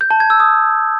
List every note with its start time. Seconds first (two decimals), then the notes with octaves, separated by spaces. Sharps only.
0.01 G6
0.11 A5
0.20 G#6
0.30 E6
0.40 D#6